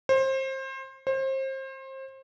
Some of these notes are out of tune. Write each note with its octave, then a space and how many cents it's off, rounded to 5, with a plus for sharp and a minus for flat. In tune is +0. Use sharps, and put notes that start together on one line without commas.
C5 +25
C5 +30